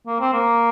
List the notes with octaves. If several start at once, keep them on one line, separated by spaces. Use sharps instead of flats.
A#3
C4
A#3